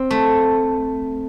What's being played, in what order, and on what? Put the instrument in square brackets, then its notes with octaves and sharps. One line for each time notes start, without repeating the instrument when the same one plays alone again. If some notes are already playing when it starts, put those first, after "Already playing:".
Already playing: [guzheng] C4
A3